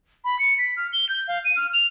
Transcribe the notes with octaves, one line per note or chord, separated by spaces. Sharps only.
B5
C#7
B6
F6
G7
G6
F5
D#7
F6
F7